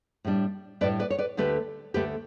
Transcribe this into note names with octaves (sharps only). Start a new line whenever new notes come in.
A2 G3 D4
A2 G3 D4 B4 D5
B4 D5
C#5
B4 D5
D2 D3 A3 G4 B4
D2 D3 A3 G4 B4